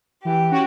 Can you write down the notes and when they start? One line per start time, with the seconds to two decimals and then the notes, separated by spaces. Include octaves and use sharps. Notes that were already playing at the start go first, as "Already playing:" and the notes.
0.25 E3 G4
0.51 C#4 F#4